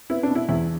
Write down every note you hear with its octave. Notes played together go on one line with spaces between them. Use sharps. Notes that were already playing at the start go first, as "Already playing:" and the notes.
B3 E4
D4
B2
E4
E2 E4